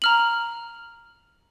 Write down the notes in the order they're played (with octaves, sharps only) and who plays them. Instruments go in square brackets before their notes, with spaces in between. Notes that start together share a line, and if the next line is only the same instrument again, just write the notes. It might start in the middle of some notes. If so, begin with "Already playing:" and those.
[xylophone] A#5 F6 F#7